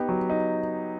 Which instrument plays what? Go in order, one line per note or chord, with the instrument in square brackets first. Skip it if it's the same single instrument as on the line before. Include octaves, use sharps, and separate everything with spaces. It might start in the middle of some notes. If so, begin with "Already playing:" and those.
Already playing: [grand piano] B3 D#4 G4
F#3
D#4